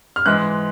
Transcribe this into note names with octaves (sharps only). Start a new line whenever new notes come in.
F6
G#2 E3 G#3 F#6